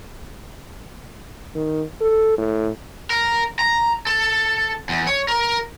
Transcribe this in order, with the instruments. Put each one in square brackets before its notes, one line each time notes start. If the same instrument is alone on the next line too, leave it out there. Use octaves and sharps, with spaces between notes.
[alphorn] D#3
A4
A2
[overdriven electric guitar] A#4
A#5
A4
E2
C#5
A#4